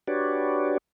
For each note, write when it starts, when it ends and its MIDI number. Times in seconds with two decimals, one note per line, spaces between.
0.07 0.78 62
0.07 0.78 66
0.07 0.78 67
0.07 0.78 71
0.07 0.78 73
0.07 0.78 74